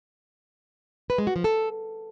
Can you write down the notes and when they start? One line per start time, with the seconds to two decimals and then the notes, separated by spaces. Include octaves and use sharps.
1.10 B4
1.18 G#3
1.27 F#4
1.36 F3
1.44 A4